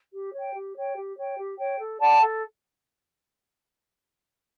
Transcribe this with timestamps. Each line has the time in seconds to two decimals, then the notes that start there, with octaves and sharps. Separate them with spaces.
0.13 G4
0.34 C#5 G5
0.55 G4
0.76 C#5 G5
0.96 G4
1.17 C#5 G5
1.37 G4
1.58 C#5 G5
1.79 A4
2.00 D5 F#5 A5
2.21 A4